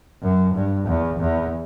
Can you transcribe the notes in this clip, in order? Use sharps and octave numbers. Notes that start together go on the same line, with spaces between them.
F#2
G2
E2
E2